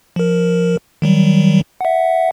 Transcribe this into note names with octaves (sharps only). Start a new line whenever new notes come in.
F3 A#4
D#3 F#3 G3
E5 F#5